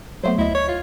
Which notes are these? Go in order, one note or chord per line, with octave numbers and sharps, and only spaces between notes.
F#3 A3 B3 C5
D2 E4 D#5
C#5
F4